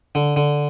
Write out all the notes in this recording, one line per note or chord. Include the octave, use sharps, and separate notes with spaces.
D3
D3